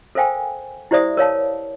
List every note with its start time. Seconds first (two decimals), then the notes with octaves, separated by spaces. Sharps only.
0.15 A4 A#4 C5 F5 G5 G#5
0.91 E4 G4 C5 D5 E5 D#6
1.17 A#4 C#5 F5 A5